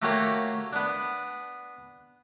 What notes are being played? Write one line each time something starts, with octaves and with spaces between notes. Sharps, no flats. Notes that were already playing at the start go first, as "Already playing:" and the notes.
A3 A#3 F#4 G4 C#5 F5
B3 D4